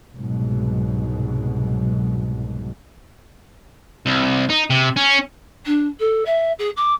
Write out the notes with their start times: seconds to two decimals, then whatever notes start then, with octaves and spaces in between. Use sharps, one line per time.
0.14 C2 G#2 B2 F#3
4.06 C2
4.50 D#4
4.70 C3
4.97 C#4
5.65 D4
5.99 A4
6.25 E5
6.58 G#4
6.76 D6